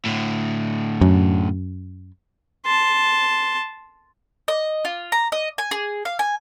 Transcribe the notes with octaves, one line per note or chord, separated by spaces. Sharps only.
A2 D3
F#2
A5 C6
D#5
F4
A#5
D#5
G#5
G#4
F5
G#5